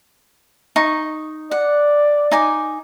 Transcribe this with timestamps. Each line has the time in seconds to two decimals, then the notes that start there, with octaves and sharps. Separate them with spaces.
0.76 D#4 C#6
1.51 D5 F#5
2.31 D#4 G#5 D6